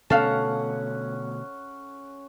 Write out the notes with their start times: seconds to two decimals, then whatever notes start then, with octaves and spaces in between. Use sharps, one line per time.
0.10 B2 D3 A3 C#4 A4 F5 F#5